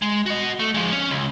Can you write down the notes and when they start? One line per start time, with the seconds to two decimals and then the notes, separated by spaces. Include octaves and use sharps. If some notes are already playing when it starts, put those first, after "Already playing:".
0.02 G#3
0.26 F#4 D#5
0.59 A3
0.74 F3 G#3
0.92 C#4
1.10 C#2